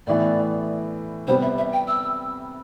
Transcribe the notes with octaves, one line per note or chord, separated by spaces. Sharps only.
A2 E3 B3 D5
C3 G3 B3 C5
E5
E5
G5
E6